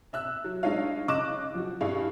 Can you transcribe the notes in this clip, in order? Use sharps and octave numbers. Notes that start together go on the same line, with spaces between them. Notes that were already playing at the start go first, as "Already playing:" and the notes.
E5 E6 F#6
F#3
G#3 D4 D#4 F4 C#5 F5
C#3 D#5 D6 F#6 E7
F3 F#4
G2 E4 G#4 F5 C#6